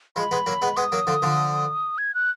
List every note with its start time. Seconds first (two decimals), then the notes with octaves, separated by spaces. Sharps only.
0.16 F3 G#3 B5
0.31 G#3 B3
0.46 F#3 A#3
0.62 G#3 B3
0.77 G#3 B3 D#6
0.92 F#3 A#3
1.07 D3 F3
1.22 D3 F3
1.98 G#6
2.15 F#6